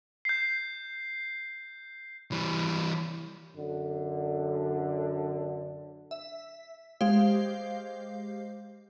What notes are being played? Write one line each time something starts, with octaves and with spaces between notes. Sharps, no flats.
G6 C7
E3 G3
F#2 D3
E5
G#3 G4 C5 F5